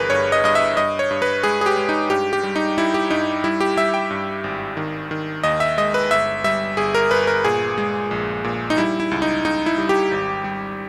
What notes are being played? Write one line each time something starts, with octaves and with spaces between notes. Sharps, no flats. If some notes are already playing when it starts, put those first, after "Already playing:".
Already playing: G1 E3 G#4 A#4 B4
G2 C#5
D#5
G2 D#5
E5
G2 D#5
C#5
G2
B4
G#3 G#4
G#4
G4
G#3
D#4
G2 G4
G4
G3
D#4
G3 E4
G4
G2 D#4
G3 E4
G4
G3 E5
G5
G2
G#1
D#3
D#3
D#2 D#5
E5
G#3 D#5
B4
G1 E5
G3 E5
G1 G#4
A#4
G1 B4
A#4
A#2 G#4
G#3
A#1
A#2
D#4
G3 E4
E4
C#2
D#4
C#2 D#4
E4
G3
G4
G#1
G3